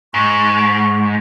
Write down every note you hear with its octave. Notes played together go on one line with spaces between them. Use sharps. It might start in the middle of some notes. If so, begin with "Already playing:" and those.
G#2 C#6